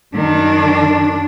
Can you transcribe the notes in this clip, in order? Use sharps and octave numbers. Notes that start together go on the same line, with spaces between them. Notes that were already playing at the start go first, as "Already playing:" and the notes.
F#2 D#3 D4